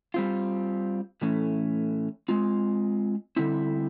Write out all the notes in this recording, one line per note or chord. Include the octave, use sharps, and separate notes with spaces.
G3 C4 F4
A2 E3 A3 C#4
G#3 C4 F4
D3 G3 C4 E4